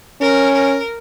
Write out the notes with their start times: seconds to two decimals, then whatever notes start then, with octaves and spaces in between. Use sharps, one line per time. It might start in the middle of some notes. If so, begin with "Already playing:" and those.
0.21 C#4 A#4
0.54 A#4